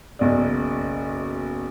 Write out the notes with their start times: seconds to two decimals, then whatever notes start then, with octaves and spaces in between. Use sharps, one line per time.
0.19 F#1 B1 D5